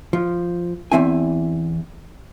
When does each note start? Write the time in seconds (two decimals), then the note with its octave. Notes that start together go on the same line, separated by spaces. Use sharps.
0.13 F3
0.92 E2 G2 E3 C4 E4 G#5